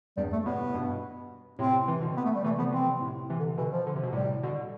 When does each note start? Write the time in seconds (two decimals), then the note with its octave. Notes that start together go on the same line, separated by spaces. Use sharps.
0.17 E2 G2 G3
0.33 A3
0.45 A2 C3 B3
0.74 G2 B2
1.59 A2 C3 C4
1.87 C3 E3
2.01 B2 D3
2.17 B3
2.25 A3
2.35 G3
2.44 C3 E3 A3
2.58 D3 F3 B3
2.72 C3 E3 C4
3.01 A2 C3
3.30 C3 E3
3.39 D3
3.58 B2 D3 E3
3.71 F3
3.87 D3
3.96 C3
4.03 B2
4.13 A2 C3 G3
4.43 B2 D3